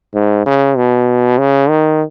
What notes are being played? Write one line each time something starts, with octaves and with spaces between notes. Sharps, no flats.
G#2
C#3
B2
C#3
D#3